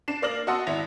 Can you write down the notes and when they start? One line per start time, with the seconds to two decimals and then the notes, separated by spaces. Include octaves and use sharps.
0.08 D4 C7 E7
0.22 A#3 D5 F6 A#6 F#7
0.47 F#4 D#5 F#5 A5 C6 E6
0.67 G#1 E4 A#6 F7